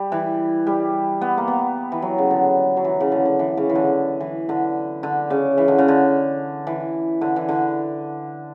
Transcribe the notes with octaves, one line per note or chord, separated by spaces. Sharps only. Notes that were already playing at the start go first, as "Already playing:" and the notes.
Already playing: G3
E3
G3
B3
A#3
B3
E3
F#3
C#3
D3
F#3
E3
C#3
D3
D3
E3
C#3
E3
D3
E3
D3
D3
C#3
E3
D3
C#3
D3
E3
D3
E3
D3